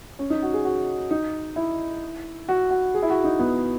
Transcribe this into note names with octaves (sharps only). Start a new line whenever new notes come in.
C#4
D#4
F#4
G#4
F#4
D#4
E4
F#4
F#4
G#4
E4
F#4
D#4
B3